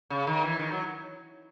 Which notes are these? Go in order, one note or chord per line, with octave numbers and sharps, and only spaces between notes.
C#3
D#3
E3
D#3
F#3